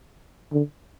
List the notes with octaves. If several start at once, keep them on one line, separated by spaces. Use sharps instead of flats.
D3